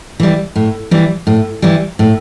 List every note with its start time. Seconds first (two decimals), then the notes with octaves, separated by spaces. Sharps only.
0.20 E3 G3
0.56 A2
0.91 E3 G3
1.27 A2
1.62 E3 G3
1.99 A2